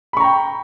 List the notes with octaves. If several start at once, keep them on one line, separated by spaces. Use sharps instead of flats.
G5 A#5 B5 C#6